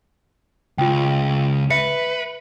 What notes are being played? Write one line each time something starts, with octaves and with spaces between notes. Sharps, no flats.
C#2 F4 G5
B4 E5 C#7